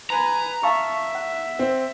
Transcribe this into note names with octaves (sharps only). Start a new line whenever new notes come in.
B4 G#5 A#5
E5 F5 A5 C#6
F#5
C4